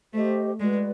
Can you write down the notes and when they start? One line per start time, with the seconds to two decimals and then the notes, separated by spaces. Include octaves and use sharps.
0.13 A3 G4 C5 D#5
0.60 G#3 F#4 B4 D5